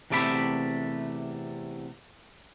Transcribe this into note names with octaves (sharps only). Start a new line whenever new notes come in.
E2 C3 A3 D5 E5 B5